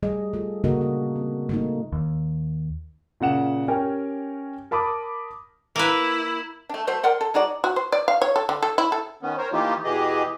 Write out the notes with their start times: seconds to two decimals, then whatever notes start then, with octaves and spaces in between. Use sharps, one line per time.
0.03 G3 A3 G#4 D#5
0.33 A3 F4 A4
0.64 C#3 A#3 D4 F#4 A#4 D#5
0.81 F#4
1.16 C4
1.49 A3 A#3 D#4
1.92 D#2
3.20 A#2 C#3 F#5 E7
3.68 C#4 G4 A#4 G5 G#5
4.71 A#4 A5 B5 D6 D#6
5.76 A#3 E4 B4
6.69 A3 D4
6.87 F#3 A3 C5 E5
7.03 A#4 D5 F#5 C6
7.21 A4
7.34 G#3 D#4 F#4 D5
7.64 F#4
7.76 C5
7.92 D5
8.08 F5
8.22 C#5
8.36 A4
8.49 D3
8.63 A4
8.78 E4
8.92 A4
9.22 D#3 B3 C#4
9.38 A#4 C5 C#5
9.53 E3 A3 A#3 D#4 F4 G4
9.84 E2 B2 E3 G4 G#4 D#5